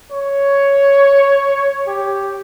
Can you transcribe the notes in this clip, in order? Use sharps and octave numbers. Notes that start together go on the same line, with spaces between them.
C#5
G4